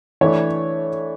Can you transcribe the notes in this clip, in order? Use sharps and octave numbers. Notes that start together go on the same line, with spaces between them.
E3 A3 D4 C#5